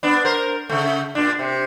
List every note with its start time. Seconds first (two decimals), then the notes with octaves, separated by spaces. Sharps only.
0.03 B3 D4
0.25 A#4 C5
0.69 C#3 A3
1.15 A#2 D4
1.39 C3